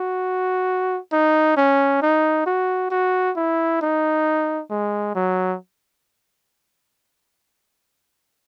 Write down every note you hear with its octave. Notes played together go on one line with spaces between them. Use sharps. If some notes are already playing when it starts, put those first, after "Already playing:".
Already playing: F#4
D#4
C#4
D#4
F#4
F#4
E4
D#4
G#3
F#3